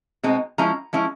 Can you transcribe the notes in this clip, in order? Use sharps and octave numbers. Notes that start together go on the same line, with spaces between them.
B2 G#3 C4 D#4
F3 G#3 C#4 E4 A#5
F3 G#3 C#4 E4